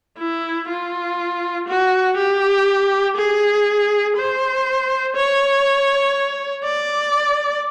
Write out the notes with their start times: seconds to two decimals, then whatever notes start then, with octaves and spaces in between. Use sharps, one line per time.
0.19 E4
0.69 F4
1.68 F#4
2.17 G4
3.17 G#4
4.17 C5
5.16 C#5
6.64 D5